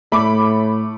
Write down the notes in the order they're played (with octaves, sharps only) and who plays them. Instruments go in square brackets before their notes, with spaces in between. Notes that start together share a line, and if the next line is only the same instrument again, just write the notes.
[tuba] A2 [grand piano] A3 [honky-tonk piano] B5 D6